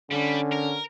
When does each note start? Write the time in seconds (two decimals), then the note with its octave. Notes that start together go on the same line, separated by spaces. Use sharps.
0.11 D3 G3 C#4
0.52 A#4